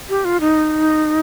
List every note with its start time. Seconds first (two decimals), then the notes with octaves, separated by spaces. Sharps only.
0.09 G4
0.25 F4
0.41 D#4